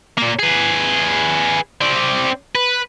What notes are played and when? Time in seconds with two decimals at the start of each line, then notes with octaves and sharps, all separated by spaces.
0.18 A#2 A#3
0.39 G#4 B4
1.81 C4 D5
2.55 B4